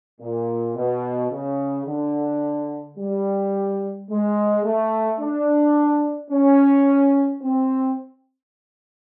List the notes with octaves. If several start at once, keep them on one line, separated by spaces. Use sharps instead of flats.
A#2
B2
C#3
D3
G3
G#3
A3
D4
C#4
C4